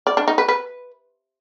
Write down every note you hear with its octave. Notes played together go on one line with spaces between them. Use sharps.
D5
D4
D#4
B4
B4